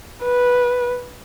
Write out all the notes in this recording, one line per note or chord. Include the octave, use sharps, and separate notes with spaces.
B4